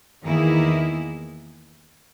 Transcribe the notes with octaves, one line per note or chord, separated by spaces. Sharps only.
E2 D#3 A#3 E4 G#4